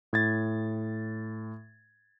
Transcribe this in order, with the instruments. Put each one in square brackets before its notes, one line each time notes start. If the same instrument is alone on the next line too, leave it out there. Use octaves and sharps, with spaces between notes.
[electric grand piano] A2 G#6 A6